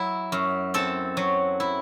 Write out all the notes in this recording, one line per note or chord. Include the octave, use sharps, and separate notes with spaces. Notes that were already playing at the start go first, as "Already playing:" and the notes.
Already playing: F#3 E4
F#2
C4 A4 A5
F#3
E4